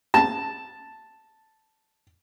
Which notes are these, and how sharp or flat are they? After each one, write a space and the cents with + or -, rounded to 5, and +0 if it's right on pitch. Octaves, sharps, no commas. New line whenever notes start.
A5 +0